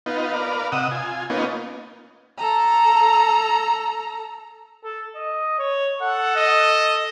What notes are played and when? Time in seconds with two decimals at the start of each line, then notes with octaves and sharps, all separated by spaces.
0.06 B3 D#4 F4
0.33 A#4 B4 D5 F5
0.72 C3 D#5 F#5 D#6 E6
0.91 F4 G#5
1.30 A#3 B3 C#4 D#4 F4
2.38 A4 A#5
4.84 A4
5.15 D#5
5.59 C#5
6.01 A4 F#5
6.36 D#5